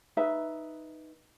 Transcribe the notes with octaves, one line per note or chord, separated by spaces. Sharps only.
D#4 B4 E5